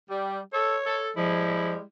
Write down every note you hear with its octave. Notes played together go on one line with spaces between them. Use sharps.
G3
A4 C#5
A4
F3 G3 G#3 E4